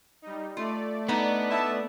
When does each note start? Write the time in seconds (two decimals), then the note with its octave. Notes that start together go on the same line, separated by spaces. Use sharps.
0.22 G3 D#4
0.57 A3 F4 D5
1.09 B3 D4 D#4 D#5
1.50 E4 E5 A5